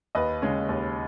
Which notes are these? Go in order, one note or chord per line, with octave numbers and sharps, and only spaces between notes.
D#2 B4 D#5
C#3 G#3 C#4
D#2